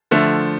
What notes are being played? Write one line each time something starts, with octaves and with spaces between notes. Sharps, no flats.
D3 F3 A3